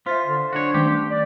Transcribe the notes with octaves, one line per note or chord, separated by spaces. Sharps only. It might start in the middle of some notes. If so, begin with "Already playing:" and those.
F4 C5 E5 A6 B6
D3
D4 F#4 C#5
D#3 A3 G4
D5